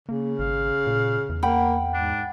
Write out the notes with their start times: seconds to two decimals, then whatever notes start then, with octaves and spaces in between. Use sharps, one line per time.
0.09 C#3 A#3
0.39 G#1 F5
0.87 A#2
1.29 E2
1.43 A#3 F#5 G5 B5
1.94 G#2 D4